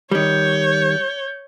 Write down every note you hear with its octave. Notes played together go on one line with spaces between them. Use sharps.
D#3 G3 C#5 G6